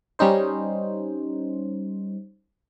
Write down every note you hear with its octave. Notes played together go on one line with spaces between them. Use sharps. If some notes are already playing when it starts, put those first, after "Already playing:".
G3 C#4 D#4 C5